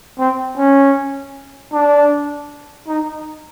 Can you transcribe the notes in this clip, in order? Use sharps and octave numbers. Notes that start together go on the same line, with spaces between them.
C4
C#4
D4
D#4